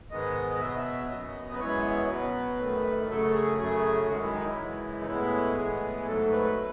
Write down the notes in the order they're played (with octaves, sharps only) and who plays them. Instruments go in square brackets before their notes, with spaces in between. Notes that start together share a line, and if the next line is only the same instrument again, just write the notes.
[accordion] G#2 D#3 G#3 B3 D#5
B2 F#3 B3 E5
D#5
E5
F#2 C#3 F#3 B3 D#5
B4
F#2 E3 G#3 B3 C#5
B2 F#3 B3 B4
F#2 D#3 A3
F#2 C#3 F#3 A3 A4
G#4
F#2 C#3 F#3 A3 G#4
F#2 D#3 G#3 F#4
E4
D#4
E4
F#2 C#3 E3 G#3
D#4
A2 G#3 B3 E4
A2 E3 G#3 B3 G#4
G#2 F#3 A3 A4
B4
B2